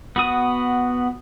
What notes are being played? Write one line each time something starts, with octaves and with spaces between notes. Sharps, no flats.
B3 F#4 D#6